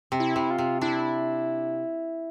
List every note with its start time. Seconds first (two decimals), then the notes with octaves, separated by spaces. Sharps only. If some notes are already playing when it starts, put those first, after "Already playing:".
0.12 C3
0.20 E4
0.36 C3
0.51 F4
0.58 C3
0.81 D4 E4